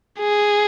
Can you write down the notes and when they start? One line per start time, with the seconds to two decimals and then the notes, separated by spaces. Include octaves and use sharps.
0.19 G#4